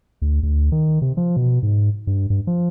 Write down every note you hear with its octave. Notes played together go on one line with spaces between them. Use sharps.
D2
D2
D#3
C3
F3
B2
G#2
G2
G2
F3